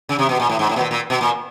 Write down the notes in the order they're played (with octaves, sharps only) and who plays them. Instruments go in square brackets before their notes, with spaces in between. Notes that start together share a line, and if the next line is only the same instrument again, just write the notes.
[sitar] C#3
C3
B2
A#2
A2
G#2
A2
B2
A#2
A#2
B2
A#2